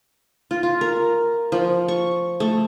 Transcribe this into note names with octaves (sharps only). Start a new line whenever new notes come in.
F4
F4
A#4
F3
C#6
A3